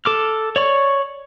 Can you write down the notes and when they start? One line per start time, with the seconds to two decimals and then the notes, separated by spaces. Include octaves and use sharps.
0.05 A4 D6 F6
0.56 C#5 D5 C#6